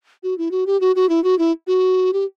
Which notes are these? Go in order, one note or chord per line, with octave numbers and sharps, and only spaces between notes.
F#4
E4
F#4
G4
F#4
F#4
E4
F#4
E4
F#4
G4